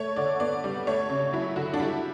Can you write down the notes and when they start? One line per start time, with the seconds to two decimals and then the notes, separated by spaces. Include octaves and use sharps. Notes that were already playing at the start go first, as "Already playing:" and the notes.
Already playing: A3 C#5
0.16 D3 D5
0.40 B3 D5
0.64 G3 D5
0.87 A3 C#5
1.09 C#3
1.33 F#3 E4
1.56 D3 F#4
1.74 D4
1.80 G3 E4